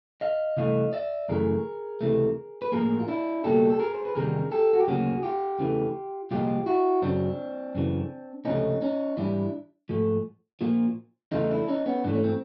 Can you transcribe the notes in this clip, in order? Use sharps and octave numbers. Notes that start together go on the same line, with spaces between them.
D#5 F5
C2 C3 E3 A3 D#5 F5
D5 E5
F#2 C#3 E3 A3 G#4 A#4
C#2 C3 E3 A3
B4
A2 F3 A#3 G#4 A#4
F4
D4 E4
C#2 B2 G3 A#3 G4 A4
A4
G#4 A#4
C5
B4
E2 C3 D#3 G3 G#4 A#4
G4 A4
F#4
G4
D2 C#3 F#3 A#3 F#4 G#4
F4 G4
E2 C#3 E3 A3
C2 A#2 F3 G#3 F4 G4
E4 F#4
F#2 C#3 F#3 C4 D4
F#2 C#3 E3
C#2 C3 F3 A3 C#4 D#4
C#4 D#4
G#2 E3 G3 D4 E4
G#2 F3 A3
A#2 F3 A#3
E2 C#3 E3 A3 D#4 F4
D4 E4
C#4 D#4
B3 C#4
G#2 E3 A3 D4
C#4
C4